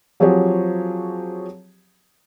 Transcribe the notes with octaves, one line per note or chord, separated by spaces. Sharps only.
F3 F#3 C4 G4 G#4 C#5